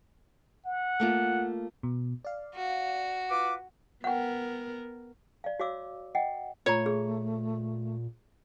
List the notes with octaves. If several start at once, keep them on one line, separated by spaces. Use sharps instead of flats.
F#5
A3 A#3 F4
B2
D5 F5
F#4
F4 B4 D6
B3 A#4 F#5 G5
D5 F5
F#4 C#5 F5 D6 E6
D#5 F#5 G5
A#2 A3 F4 C#5 A#5
G#4